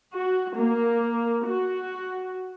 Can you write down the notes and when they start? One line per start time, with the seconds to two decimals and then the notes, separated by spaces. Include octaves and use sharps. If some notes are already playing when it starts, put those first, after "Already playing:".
0.14 F#4
0.57 A#3
1.47 F#4